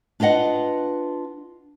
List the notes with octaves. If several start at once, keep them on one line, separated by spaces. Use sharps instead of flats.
D4 F4 B4 D#5 F#5